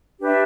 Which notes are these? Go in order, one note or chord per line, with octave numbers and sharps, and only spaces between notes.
D4 G4 B4 E5